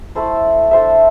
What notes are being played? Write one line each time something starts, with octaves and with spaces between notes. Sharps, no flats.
A3 E4 A4 C5
D4 A4 C5 E5